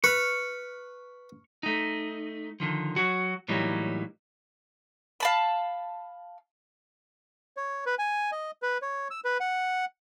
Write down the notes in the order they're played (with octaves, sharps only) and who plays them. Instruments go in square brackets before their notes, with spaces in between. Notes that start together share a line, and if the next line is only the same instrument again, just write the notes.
[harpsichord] B4 [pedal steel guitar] C#6 F6
[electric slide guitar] A3 D#4
D3 D#3 F3
F#3 F#4
A2 E3 F#3 G3 A#3 D#4
[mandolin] F5 A5 B5
[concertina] C#5
B4
G#5
D#5
B4
C#5
E6
B4
F#5